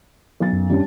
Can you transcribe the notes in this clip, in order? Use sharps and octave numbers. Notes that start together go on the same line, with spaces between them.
B1 A6
F#2
G3 C#4 D4